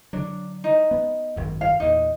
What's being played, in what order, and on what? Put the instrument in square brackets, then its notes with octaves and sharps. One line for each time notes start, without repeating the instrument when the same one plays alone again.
[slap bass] D3 F#3 [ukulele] D4
[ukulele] D#4
[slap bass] B3
G#1 F#2
[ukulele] F5
[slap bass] E2 A#2 [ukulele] D#4